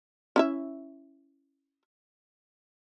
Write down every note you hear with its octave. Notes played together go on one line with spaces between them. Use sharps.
C#4 E4 E5